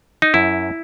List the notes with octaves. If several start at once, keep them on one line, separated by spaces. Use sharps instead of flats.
D#4
F#2 E4